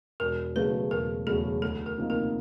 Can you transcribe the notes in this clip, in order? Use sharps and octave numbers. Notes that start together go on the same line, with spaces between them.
E1 A#4
E2 C#3 F#3 A3 B4
E1 A#4
E2 C#3 F#3 A3 A4
D2 A4
A#4
C3 F3 A#3 D#4
A#4